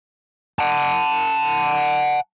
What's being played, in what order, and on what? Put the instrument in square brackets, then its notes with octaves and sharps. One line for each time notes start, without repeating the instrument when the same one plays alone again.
[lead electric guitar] F#5 A5